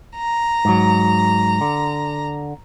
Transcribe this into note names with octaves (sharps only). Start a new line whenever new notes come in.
A#5
G#2 F#3
D3